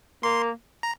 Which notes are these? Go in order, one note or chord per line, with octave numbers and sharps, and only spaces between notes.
A#3 C6
A#5